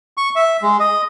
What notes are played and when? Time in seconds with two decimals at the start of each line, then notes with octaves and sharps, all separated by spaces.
0.17 C#6
0.36 E5
0.62 G#3
0.79 D#5